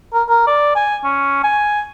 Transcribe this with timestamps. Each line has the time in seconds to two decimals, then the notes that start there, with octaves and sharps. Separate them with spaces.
0.14 A#4
0.29 A#4
0.47 D5
0.75 G#5
1.04 C#4
1.44 G#5